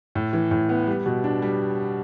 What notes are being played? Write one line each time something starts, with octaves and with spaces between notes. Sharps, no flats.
A2
E3
A2
B3
G3
B2
D4
G3